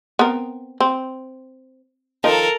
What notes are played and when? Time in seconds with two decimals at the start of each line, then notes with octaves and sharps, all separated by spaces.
0.19 B3 C4 A#4
0.80 C4
2.24 D#3 F3 D#4 A4 A#4